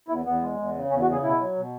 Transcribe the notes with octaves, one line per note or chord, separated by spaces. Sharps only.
E2 E4
E2 B3
G#3
E2
C#3
E2 C#4
F#4
C#3
G#4
B2 E4
F#3
B2